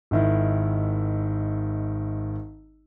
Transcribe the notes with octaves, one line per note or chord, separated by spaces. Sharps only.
G#1 D#3 E4